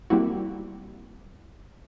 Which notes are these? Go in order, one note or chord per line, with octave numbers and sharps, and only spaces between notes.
G3 A#3 C4 E4 F#4